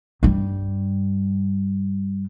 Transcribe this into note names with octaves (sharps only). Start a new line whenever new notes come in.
G2 G3